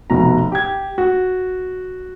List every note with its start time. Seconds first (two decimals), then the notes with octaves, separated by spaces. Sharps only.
0.10 F1 B2 A#5
0.52 G4 G#6
0.98 F#4